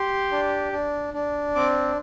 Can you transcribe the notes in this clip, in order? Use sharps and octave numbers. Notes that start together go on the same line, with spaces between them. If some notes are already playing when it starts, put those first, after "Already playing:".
Already playing: G4 C6
D4
D4
D4
C4 D6